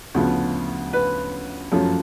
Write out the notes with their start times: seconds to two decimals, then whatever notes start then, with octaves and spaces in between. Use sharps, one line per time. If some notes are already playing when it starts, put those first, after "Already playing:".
0.14 D2 C#3 F3 B3
0.93 B4
1.72 F#2 F3 A3 C#4